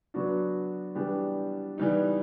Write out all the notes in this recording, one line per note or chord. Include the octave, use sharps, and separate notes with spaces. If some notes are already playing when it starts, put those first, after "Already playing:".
F#3 B3 D4 F#4
E3 G3 B3 D4 G4
E3 G3 B3 D#4